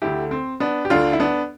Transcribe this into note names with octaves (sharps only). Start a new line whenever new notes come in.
D2 D3 A3 E4 G4
C4
B3 D4
G4
D2 D3 A3 D4 F4
E4
B3 D4